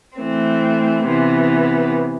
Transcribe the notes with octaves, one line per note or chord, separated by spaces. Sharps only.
E3 A3 C4
C3 E3 B3